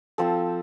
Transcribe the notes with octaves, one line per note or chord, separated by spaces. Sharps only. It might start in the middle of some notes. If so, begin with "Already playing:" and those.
F3 C4 F4 A4